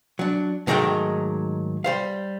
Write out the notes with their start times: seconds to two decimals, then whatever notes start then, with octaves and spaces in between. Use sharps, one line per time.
0.19 F#3 D4
0.67 G#2 D#3 F#3 G#3 A3 G5
1.84 G3 C5 F5